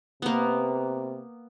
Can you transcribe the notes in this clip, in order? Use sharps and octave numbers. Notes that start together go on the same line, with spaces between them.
C3 A#3 B3